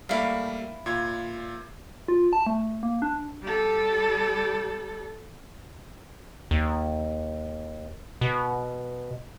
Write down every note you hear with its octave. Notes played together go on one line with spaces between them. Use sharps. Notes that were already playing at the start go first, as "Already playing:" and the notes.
G3 A3 A#3 E4 F5
A#2 F4 G#6
F4
A5
A3
A#3
D4
G3 A4
D#2
B2